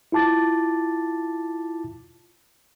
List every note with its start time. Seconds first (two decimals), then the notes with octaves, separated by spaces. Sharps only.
0.12 E4 F4 A5 D6 A6